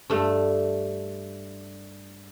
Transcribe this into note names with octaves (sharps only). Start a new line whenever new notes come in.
G2 A3